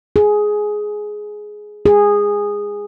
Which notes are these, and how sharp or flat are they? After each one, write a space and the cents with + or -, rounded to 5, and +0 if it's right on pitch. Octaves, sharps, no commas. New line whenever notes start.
G#4 +10
G#4 -15